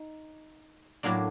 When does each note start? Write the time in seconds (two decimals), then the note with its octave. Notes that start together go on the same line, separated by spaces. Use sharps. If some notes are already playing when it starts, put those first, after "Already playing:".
Already playing: D#4
1.03 A2 F#3 A#3 D4